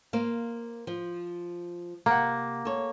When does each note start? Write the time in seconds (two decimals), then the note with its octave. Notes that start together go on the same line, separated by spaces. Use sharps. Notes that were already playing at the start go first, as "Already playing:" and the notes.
0.13 A#3 C5 F5
0.87 F3
2.06 C3 A#3 F#5
2.65 A4 C#5